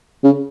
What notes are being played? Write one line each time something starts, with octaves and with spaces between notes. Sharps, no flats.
C#3